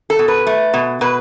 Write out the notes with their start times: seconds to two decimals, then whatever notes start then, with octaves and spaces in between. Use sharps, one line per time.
0.10 A4
0.19 B2
0.28 B4
0.47 A3
0.74 B2
1.01 B2 B4